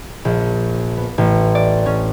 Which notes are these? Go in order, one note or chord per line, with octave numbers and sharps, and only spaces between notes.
A#1
B3
A1
D5
C#4